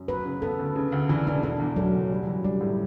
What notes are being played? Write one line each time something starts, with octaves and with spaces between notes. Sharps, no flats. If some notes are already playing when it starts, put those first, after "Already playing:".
Already playing: F#2
F#3 B4
C#3
B3 A4
D2
C#3
D2
E3 D4
E1 D4
D3 D4
E2
F#3 A3
F#1
G3
E3
G3 D4
A2